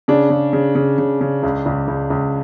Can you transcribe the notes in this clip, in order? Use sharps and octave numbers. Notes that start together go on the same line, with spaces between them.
C#3 D4
C#3
C#3
C#3
C#3
C#3
C#2
C#2
C#2
C#2